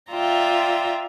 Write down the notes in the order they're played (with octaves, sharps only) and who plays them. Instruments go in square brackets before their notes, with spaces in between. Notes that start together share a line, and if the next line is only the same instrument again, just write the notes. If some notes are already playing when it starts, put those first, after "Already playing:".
[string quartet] F4 D5 E5 G5 A#5